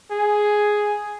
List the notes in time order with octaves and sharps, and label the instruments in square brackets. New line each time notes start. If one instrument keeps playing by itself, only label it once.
[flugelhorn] G#4